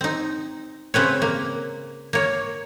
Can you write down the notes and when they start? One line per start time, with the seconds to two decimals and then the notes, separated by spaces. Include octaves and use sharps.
0.01 C4 D#4
0.94 C#3 C4 B4 C#5
1.22 A#3
2.13 A#3 C#5